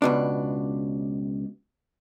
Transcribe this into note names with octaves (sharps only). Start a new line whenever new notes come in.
C#2 B2 D4